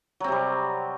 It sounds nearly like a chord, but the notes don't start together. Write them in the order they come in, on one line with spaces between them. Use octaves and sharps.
F#3 C4 C3 G3